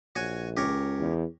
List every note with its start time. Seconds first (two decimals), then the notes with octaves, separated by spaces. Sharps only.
0.16 A#1 F#4 C#5 G#5
0.57 C#2 G4 A#4 C#5
1.00 E2